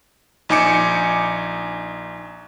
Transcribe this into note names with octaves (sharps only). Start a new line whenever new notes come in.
A#1 D#4 G#5 D6 C#7